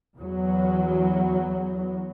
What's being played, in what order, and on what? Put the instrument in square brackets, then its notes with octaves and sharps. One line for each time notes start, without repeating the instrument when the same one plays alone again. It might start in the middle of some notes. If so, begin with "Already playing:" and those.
[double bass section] E2 F#3